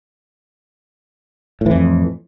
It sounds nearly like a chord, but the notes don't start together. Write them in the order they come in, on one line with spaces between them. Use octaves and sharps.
A2 E3 F2